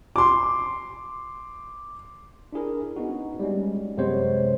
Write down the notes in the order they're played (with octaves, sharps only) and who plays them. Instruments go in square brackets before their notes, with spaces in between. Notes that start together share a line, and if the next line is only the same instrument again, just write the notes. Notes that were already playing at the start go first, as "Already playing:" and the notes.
[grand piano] C6 D6
[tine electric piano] D4 E4 G#4 A#4
B3 C#4 D#4 F#4
G3 G#3 C#4
F#2 C3 G#3 B3 C5 C#5